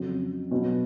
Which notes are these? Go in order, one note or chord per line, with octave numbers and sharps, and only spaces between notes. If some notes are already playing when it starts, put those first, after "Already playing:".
Already playing: F2 C#3 F#3
B2 F#3 B3